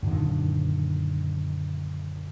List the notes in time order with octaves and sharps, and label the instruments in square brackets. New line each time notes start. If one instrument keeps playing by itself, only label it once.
[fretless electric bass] F#2 A#2 D3 D#3